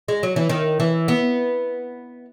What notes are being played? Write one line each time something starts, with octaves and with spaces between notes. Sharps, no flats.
G#3
F#3
E3
D#3
E3
B3